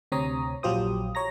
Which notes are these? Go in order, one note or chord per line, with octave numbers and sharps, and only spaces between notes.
D2 C3 C4 C#5 A#5 D#6
A#1 F#3 F4 G4 C5 D#6
C#5 A#5 A#6